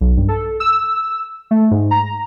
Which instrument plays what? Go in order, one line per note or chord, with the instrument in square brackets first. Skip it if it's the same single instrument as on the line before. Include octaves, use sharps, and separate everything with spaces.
[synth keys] B1
G2
A4
E6
A3
G#2
A#5